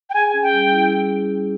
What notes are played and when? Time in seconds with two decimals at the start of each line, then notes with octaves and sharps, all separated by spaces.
0.10 G5
0.14 G#4 G#5
0.33 C#4
0.42 G5
0.52 G3
0.71 E4